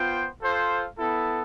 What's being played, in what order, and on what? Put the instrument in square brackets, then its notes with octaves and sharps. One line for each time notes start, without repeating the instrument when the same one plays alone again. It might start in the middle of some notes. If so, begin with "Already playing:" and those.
Already playing: [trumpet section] B3 F4 C5 G5
F4 A4 C5
B3 E4 A4